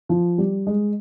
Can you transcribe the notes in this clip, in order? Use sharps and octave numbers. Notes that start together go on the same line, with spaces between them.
F3
G3
G#3